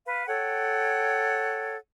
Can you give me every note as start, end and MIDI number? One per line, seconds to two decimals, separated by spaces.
0.05 0.26 71
0.05 0.26 77
0.27 1.76 69
0.27 1.76 73
0.27 1.76 78
0.27 1.76 79